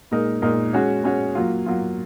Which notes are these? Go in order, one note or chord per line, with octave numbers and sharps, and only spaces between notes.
A#2 G#3 D#4 A#4
A#2 G#3 D#4 A#4
G#3 C#4 F#4 C#5
G#3 C#4 F#4 C#5
F#3 A#3 F4
F#3 A#3 F4